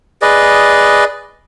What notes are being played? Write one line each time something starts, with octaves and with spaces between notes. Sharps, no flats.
G#4 B4 D5 D#5